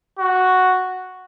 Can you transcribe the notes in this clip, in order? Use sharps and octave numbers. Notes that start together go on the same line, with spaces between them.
F#4